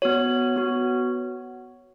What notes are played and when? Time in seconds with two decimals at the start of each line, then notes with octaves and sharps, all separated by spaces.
0.02 B3 F#4 C#5
0.56 B3 F#4